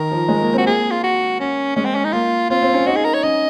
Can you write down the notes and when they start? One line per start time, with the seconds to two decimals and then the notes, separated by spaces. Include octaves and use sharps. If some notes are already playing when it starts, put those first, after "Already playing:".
Already playing: D#3 A#4
0.11 F3
0.29 G#3
0.41 A#3
0.54 C4 F#4
0.66 A#3 G#4
0.91 F4
1.03 F#4
1.40 C#4
1.76 G#3 C#4
1.85 C4
1.95 C#4
2.05 D#4
2.13 A#3 F4
2.50 C4 F4
2.63 C4
2.74 C#4
2.87 D#4 F#4
2.96 G#4
3.05 A#4
3.14 C#5
3.23 C#4 D#5